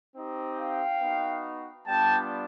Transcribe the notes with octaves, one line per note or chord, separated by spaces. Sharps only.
C4 D#4 G4
F5 G5
B3 D#4 F#4
G3 B3 D4 F4 G5 A5